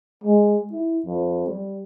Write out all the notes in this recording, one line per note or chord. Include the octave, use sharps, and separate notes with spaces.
G#3
E4
F2
G3